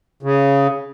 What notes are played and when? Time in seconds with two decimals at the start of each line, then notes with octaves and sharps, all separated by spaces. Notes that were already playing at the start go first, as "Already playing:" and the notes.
0.23 C#3